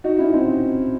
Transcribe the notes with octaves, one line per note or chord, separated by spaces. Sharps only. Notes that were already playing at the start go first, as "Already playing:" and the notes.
D#4 F#4
C#4 E4
C4 D#4